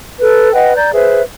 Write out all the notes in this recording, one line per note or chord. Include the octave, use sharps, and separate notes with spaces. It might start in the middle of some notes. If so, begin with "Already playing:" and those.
A4 B4
B4 D#5 F#5 G5
D5 A#5 G6
G#4 B4 C5 E5